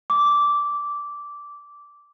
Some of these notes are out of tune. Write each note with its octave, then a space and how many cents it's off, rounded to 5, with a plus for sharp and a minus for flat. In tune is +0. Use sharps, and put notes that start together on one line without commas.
D6 -10